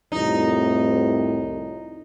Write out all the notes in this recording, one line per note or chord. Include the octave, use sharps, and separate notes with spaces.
C2 F2 A2 D#4